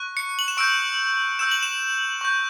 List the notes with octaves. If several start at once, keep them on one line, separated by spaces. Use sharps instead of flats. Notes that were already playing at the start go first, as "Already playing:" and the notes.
Already playing: C#6 F#6
C#7
F#7
E7
C#6 E6 G6 D7
C#6 E6 G6 E7
F#7
E7
C#6 G6